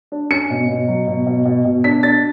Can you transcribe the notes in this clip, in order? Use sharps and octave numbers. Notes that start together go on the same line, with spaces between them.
D4
C#4 C#7
B2
B2
F#3
B2
B2
B2
B2
D4 B6
D4 A6